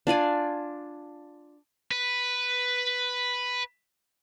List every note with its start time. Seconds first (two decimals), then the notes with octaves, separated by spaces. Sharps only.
0.07 D4 F4 D5 G#5
1.91 B4 B5